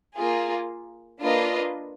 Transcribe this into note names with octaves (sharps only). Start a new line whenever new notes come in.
A#3 F4 G#4
A#3 D4 F4 B4 D#5